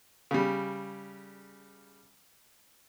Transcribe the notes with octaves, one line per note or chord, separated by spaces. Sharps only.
C#3 G3